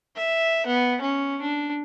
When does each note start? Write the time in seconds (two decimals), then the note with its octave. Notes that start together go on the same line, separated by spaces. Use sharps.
0.16 E5
0.67 B3
1.02 C#4
1.42 D4